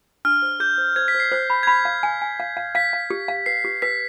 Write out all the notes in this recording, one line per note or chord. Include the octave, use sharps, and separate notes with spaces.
D4 F6
C5
G#4 G6
C5
C5 G#6
B6
C5
C7
C5
B5
G#6
B5 B6
F5
G#5
G#5
F5
F5
F5 B6
F5
G4
F5
B4 C7
G4
B4 B6